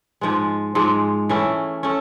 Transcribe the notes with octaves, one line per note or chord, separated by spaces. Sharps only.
G#2 F3 G#3
G#2 F3 G#3
E3 A3 C#4
A3 C#4